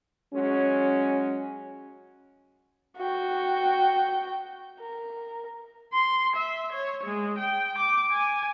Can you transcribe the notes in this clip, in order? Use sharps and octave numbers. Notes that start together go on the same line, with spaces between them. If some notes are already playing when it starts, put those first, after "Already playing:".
F#3 G#3 C#4
F#4 G5
A#4
C6
E5
C#5
G#3
G5
D6
G#5